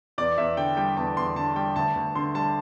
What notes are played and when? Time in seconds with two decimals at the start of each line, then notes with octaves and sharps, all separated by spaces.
0.18 E2 D5
0.38 E2 E5
0.57 D3 G5
0.77 G3 G5
0.97 E2 A5
1.17 E2 C6
1.36 D3 A5
1.56 G3 G5
1.76 D2 A5
1.95 D2
2.15 D3 C6
2.35 G3 A5